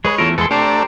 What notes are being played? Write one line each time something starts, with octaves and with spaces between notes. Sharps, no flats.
G#3 G#4 B4 C#5 B5
E2 A3 F4 A4 A#4
E2 G#3 A4 B4 C6
A3 D4 G4 C5 A#5